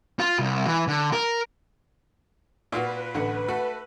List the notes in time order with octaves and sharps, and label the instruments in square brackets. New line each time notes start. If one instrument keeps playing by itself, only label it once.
[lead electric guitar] F4
C2
E3
D3
A#4
[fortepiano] A#2 F4 F#4 [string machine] B4
[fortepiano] A1 D3 F#5
A3 F#4 A4